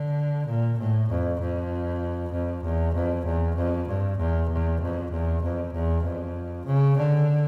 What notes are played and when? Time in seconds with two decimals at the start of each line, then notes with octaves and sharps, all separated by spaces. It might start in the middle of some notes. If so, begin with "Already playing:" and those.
Already playing: D3
0.47 A#2
0.79 A2
1.09 F2
1.40 F2
2.32 F2
2.64 E2
2.95 F2
3.25 E2
3.56 F2
3.88 G2
4.18 E2
4.50 E2
4.81 F2
5.11 E2
5.43 F2
5.73 E2
6.04 F2
6.66 C#3
6.98 D3